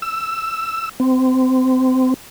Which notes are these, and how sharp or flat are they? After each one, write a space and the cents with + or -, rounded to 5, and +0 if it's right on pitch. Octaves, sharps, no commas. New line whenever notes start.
E6 +10
C4 -25